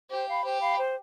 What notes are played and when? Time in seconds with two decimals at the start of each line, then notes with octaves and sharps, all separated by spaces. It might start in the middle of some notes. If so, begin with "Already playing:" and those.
0.10 G4 C5
0.27 F5 B5
0.44 G4 C5
0.60 F5 B5
0.78 C5